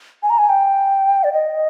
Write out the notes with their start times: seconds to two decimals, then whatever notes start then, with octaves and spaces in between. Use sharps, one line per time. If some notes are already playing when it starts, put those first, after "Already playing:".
0.23 G#5
0.30 A#5
0.38 G#5
0.49 G5
1.24 D5
1.33 D#5